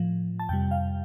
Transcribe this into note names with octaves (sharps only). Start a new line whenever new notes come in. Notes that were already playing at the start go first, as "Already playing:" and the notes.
Already playing: A2 F3
A5
F2 C3 G3 G5
F5